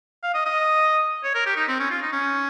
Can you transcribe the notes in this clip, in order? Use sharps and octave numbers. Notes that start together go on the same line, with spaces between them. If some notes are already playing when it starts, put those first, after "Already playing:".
F5
D#5
D#5
C#5
A#4
G4
D#4
C4
C#4
F4
D#4
C#4